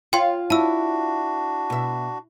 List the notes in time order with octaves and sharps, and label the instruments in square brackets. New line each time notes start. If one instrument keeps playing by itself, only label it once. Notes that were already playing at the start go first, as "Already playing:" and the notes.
[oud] F4 C#5 F5 [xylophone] G5 C6
[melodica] D4 F#4 [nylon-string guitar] E4 [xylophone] A5 E6
[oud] B2 E5